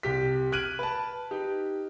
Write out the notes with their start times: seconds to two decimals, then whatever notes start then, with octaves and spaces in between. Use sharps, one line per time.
0.03 C2 G4 B6
0.52 F6 F#6 G#6 D7 D#7 F#7
0.79 B4 A5
1.31 D#4 G4